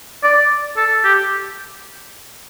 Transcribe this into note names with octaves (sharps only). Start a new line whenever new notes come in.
D5
A4
G4